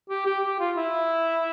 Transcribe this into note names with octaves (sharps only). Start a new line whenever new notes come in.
G4
G4
G4
F4
E4